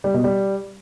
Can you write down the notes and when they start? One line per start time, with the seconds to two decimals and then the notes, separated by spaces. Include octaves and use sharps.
0.04 G3
0.14 B2
0.24 G3